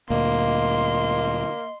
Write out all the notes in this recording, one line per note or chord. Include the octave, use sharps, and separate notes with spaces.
D2 A#2 A#3 D#5 C6